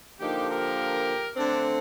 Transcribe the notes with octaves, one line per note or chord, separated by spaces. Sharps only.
D3 F3 A#3 D#4 G4
G4 A#4
D3 A3 C4 D4